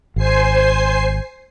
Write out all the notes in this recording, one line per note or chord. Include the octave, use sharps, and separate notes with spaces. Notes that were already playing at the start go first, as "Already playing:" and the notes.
G#1 C5 G#5 C7